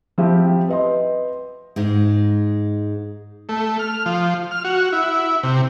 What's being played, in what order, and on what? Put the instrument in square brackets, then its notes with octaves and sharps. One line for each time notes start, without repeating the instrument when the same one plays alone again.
[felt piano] F3 C4 E4 G4
B4 D#5 C6
[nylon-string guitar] G#2 G#3
[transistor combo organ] A3
F6
F3
F6
F#4
E4
C3